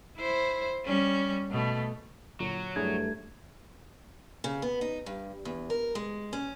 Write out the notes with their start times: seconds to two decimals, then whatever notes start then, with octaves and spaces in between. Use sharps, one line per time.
0.18 E4 C5
0.86 G3 C#4
1.51 B2 A3
2.40 A#2 D3 F#3
2.76 G2 A3 D4 E4 G#4 G#6
4.44 C#3
4.62 B3
4.81 D#4
5.06 G2
5.45 E2
5.70 A#4
5.95 G#3
6.33 C#4